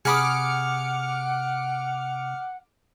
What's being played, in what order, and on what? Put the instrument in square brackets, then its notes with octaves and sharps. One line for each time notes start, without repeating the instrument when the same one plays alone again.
[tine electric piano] C3 [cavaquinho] G#4 B5 D#6 [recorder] F#5 [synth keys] D6 F6 C#7